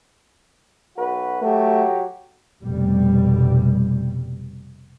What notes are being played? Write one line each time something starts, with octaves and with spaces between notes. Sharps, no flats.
B1 F#4 B4
F#3 A3 F#4 G4
F1 B2 G3